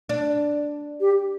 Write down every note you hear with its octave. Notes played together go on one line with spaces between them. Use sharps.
D4
G4